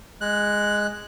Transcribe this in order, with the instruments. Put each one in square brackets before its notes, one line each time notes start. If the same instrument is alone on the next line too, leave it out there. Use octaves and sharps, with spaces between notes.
[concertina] G#3 F#6